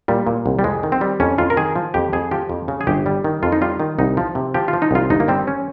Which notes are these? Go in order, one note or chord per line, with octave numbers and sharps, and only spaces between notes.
A#2 G3
A#2
C2
G3
F2 G#3
D#3
C4
G3
F2 C#4
F2 F4
A#4
D#3 G#4
F3
F2 G4
F2 G#4
F3 G4
F2
C#3
G#4
G1 G4
G3
D#3
F2 F4
D#4
G3 F4
D#3
C2 D#4
F3
C3
F3 G4
F4
F3
D#4
C2 F4
G1 D#4
A#3
G3 C4
C#4